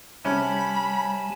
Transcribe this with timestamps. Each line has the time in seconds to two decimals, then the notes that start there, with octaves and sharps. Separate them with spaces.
0.25 C3 G3 C#4 G#5 A5 B5